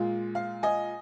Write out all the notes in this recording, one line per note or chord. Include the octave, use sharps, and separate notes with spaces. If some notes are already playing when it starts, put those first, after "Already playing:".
Already playing: A#2 G#3 F4
F5
D#5 G#5